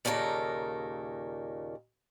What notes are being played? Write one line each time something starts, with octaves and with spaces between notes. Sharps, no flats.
D#2 A#2 C#3 A4 A#4